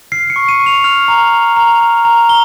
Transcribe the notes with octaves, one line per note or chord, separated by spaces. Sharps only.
F6 C7
C#7
C#6
D#7
C#6
F7
F6 F7
A#5
A#5
A#5
F6
A#5
A#5 G7